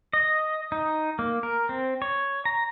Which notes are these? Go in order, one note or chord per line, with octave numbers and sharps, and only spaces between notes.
D#5
D#4
A#3
A#4
C4
C#5
A#5